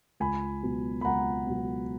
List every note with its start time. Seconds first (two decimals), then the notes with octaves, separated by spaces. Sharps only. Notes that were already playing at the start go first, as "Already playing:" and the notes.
0.20 C#2 G#5 B5
0.63 B2 F#3
1.01 B5
1.05 C#2 F#5 A#5
1.46 B2 F#3